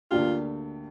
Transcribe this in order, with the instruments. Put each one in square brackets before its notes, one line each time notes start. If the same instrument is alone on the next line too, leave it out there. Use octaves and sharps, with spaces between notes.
[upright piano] D2 D3 A#3 D4 G4 [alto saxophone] F4